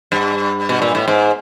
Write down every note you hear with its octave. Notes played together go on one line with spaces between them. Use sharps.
G2
B2
A#2
A2
G#2